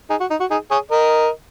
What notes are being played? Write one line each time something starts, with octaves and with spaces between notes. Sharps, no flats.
D#4 G#4
F#4
D#4
F#4
D#4 G#4
G#4 C#5
A#4 D#5